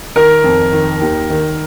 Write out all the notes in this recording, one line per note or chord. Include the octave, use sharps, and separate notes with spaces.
D#3 A#4
F2
D#3
D#2
D#3